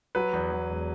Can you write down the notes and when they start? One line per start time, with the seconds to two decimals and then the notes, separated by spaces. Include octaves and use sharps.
0.15 F#3 B4
0.33 E2
0.52 E2
0.70 E1